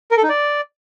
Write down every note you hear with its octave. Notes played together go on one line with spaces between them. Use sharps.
A#4
A4
D#4
D5